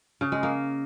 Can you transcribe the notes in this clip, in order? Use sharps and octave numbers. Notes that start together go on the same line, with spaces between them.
C#3
G#3
A#3